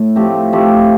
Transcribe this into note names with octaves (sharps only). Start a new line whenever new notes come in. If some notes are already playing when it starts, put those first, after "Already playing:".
Already playing: A2
F3 A3 C4 G4
F3 A3 C4 G4